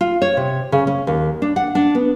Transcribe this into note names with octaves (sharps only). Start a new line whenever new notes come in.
F4
C#5
C3
C#3
C#4
D#2
D4
F#5
D4
B3